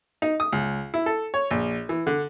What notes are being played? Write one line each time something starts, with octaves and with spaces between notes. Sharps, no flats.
D#4
D#6
C#2
E4
A4
C#5
A#1
E3
D3